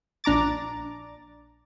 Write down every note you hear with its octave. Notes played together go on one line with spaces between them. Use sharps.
A#1 D4 A#5 D6 A6